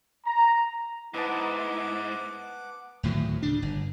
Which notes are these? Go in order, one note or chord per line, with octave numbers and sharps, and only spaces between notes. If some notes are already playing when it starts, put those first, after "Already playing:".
A#5
G#2 B3 E4 F#5 A5 D6
D2 A2 D#3 F#3
C#3 D4
G1